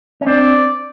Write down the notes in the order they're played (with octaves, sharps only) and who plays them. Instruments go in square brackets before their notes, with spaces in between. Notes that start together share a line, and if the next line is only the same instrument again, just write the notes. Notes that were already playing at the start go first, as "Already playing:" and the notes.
[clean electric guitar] C#4
[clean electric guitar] C4 D4 [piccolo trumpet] D5